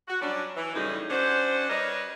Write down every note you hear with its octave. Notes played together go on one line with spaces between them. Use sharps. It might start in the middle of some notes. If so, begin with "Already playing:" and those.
F#4
F#3 G3 C#4 D4
E3
F#2 A2 C#3 E3 G3 D#4
C#4 D4 F#4 C5
G3 A#4 B4 C#5 D#5